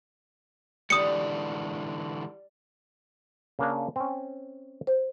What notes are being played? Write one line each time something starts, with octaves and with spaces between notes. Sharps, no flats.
D3 E3 G3 G#3 D#6 C#7
C#3 A#3 D4
C4 C#4
C5